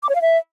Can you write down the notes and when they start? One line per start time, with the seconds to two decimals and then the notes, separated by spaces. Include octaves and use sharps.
0.03 D6
0.09 C#5
0.15 F5
0.21 E5